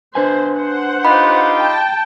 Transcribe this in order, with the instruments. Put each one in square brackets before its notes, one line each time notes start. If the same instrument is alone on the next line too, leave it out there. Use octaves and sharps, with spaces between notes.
[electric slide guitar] D4 B4 G#5 [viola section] C5
[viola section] C5 F#5
[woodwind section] D#4 F4 G4 [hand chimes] B5
[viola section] G5 A5